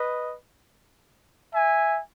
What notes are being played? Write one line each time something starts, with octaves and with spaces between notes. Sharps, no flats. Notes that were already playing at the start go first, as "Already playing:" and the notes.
Already playing: B4 D#5
E5 G#5